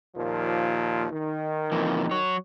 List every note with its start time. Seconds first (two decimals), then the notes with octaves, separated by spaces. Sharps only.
0.16 D#2 A#2 F3
1.12 D#3
1.72 F2 A#2 E3
2.11 F#3 C#5